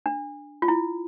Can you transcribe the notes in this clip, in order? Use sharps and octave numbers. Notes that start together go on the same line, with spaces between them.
D4
F4
E4